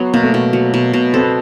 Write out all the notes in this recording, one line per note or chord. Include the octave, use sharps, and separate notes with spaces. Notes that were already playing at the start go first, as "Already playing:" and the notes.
Already playing: F#3 B3
B2 A#3
A3
B2
F#3
B2
B2
C4 A4
B3